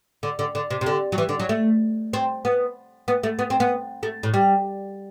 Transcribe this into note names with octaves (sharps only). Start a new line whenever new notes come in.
D3
D3
D3
C3
C3
D3
F#3
E3
D3
F#3
A3
C4
B3
B3
A3
B3
C4
B3
A3
A2
G3